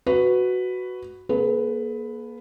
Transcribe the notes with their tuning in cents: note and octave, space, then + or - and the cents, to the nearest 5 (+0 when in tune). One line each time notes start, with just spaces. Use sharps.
F#4 +0 B4 +5
A#3 +30 G#4 +45 B4 +5